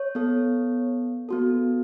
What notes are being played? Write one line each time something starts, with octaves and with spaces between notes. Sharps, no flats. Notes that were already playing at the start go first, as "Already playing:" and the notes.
Already playing: C#5
B3 A4
B3 F#4 A4